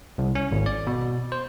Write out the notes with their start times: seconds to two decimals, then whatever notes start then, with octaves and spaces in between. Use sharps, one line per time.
0.18 C2
0.35 C#4
0.52 G#1
0.66 D5
0.87 B2
1.32 C5